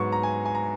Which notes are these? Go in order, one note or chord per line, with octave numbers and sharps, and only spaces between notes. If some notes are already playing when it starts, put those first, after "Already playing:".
Already playing: G#2 F#3 B3 C#6
A#5
G#5
G#5
A#5